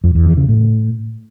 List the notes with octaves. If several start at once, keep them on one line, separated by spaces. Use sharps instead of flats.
F2
E2
E3
C#3
A2